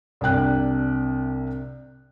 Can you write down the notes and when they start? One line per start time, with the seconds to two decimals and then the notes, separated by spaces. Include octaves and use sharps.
0.21 C2 C3 D4 G5 F#6